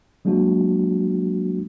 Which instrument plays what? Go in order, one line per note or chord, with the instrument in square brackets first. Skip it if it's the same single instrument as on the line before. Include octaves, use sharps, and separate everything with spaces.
[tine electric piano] F#3 G#3 A#3 D4 F#4